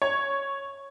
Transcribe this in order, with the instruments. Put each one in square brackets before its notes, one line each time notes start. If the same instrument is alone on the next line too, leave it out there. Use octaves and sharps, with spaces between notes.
[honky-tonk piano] C#5